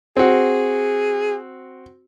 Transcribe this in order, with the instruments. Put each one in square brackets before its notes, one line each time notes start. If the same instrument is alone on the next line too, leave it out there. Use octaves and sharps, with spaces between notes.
[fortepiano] C4 F#4 [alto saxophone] G#4